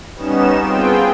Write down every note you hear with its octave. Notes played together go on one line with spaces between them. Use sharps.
G3 B3 C#4 D#4 E7
B3 C4 F4 G#4 G5